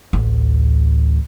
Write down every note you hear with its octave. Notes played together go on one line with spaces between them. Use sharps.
A1 D2